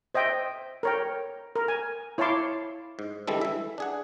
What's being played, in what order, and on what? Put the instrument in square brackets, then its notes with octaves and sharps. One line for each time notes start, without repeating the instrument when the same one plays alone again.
[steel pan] C5 D#5 E5 G5
A#4 C#5 G5
A#4
G#5
E4 C#5 F5 A5 C6 D6
[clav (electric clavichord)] G#2
D3 E3 G3 G#3 A4
E3 E5
D4 G#4 F#5